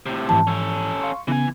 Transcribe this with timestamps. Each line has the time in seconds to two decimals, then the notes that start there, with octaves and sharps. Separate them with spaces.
0.06 A2 C3
0.29 G#2 E3 F3 A5
0.47 C#4 A4
1.01 F5 C6 C#6
1.28 C#3 E3 B3 G#5